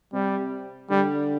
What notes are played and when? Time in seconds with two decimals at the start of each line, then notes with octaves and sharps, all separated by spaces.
0.13 C3 G3
0.90 D3 G3